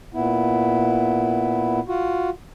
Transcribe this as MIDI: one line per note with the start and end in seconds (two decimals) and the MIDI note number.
0.14 1.80 46
0.14 1.80 59
0.14 1.80 64
1.88 2.30 65
1.88 2.30 66